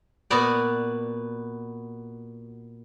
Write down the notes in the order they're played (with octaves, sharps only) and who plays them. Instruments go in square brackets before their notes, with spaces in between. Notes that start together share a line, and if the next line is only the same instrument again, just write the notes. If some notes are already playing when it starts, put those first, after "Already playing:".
[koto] A#2 B3 F#4 D5